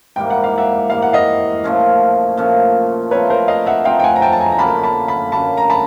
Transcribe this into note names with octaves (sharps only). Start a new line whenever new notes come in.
G#2 E3 G3 A#3 G5
F#5
F5
E5 F#5
G#2 E3 G3 A#3 F5
F#5
D#5 F5
A#2 F3 A3 C#4
A#2 F3 A3 C#4
F3 A3 C4 D#4 B4 C#5
A#4 C5
D#5 F5
E5 F#5
F3 A3 C4 D#4 F5 G5
G5
F#5 G#5
A#5
G5 A5
A5
G#5 A#5
A#5
D3 F#3 A#3 C#4 A5 B5
A5 B5
A5 B5
D3 F#3 A#3 C#4 A5 B5
A#5
A5 B5